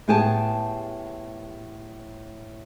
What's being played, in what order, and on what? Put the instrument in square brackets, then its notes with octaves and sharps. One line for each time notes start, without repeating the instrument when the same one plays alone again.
[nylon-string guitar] A2 B3 G4 G#4 G#5 A5